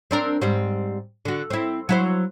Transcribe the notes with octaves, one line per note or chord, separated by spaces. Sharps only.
C4 D4 A#4
G#2 G3 C4
D3 F#4
C4 E4
F#3 E4 C5